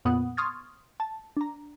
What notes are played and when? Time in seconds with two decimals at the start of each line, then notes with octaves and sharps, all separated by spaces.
0.05 F2 A#2 B3 F#5 D#6
0.37 C6 C#6 D#6 F6 G#6 A6
1.00 A5
1.37 D4 A#5